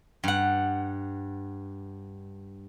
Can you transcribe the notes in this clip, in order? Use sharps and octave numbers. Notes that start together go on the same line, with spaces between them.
G2 F#5